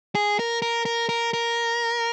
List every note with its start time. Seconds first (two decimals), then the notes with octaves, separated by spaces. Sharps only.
0.15 G#4
0.39 A#4
0.62 A#4
0.85 A#4
1.09 A#4
1.33 A#4